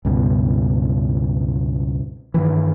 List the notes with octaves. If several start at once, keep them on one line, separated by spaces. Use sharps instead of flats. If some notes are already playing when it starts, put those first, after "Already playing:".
C#2 G2 B2
G2 D#3 E3